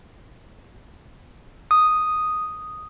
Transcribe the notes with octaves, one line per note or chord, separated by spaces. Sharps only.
D#6